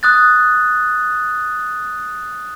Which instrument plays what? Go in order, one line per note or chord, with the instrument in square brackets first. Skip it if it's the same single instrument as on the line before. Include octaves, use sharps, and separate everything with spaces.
[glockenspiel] D#6 F#6 A6